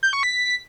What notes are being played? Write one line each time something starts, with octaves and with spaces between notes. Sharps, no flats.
G6
C#6
B6